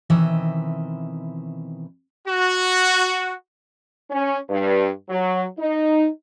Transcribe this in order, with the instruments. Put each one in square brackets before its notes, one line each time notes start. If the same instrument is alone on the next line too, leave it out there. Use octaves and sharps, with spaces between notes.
[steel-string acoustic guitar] B2 D#3 E3 C4 D#5 E5
[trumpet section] F#4
[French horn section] C#4
G2
F#3
D#4